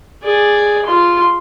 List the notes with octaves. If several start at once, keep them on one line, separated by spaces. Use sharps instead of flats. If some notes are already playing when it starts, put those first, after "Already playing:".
G#4 D5
F4 C6